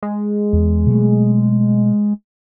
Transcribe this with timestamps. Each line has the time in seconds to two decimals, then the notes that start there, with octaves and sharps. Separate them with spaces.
0.03 G#3
0.53 E2
0.87 B2 F#3 A3